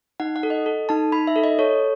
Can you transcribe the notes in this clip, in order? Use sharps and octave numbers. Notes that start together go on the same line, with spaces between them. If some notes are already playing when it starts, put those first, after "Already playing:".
D#4 F#5
F#5
A4
D#5
A4
D#4 A5
D#4 B5
E5
A4
D#5
A4 C#5